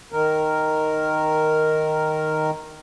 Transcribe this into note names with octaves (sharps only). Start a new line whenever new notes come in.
D#3 A#4